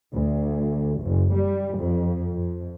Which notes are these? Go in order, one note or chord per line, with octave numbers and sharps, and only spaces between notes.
D2
F#1
G3
F2
F2